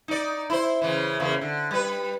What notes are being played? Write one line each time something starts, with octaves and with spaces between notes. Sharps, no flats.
D#4 D5
E4 C5
C#3 E3
E2 C#3 A#3
D3
G3 B4